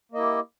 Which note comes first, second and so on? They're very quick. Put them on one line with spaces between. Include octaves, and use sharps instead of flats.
A#3 D#5 E4 G4